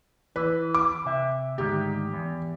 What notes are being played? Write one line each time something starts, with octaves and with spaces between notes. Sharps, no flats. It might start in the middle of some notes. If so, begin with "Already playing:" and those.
E3 B4
D6
C3 E5
D2 G#2 D#3 G4
E2